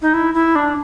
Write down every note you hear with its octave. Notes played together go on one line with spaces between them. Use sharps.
D#4
E4
E4
D4